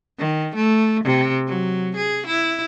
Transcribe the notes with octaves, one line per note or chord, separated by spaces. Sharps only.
D#3
A3
C3
F#3
G#4
E4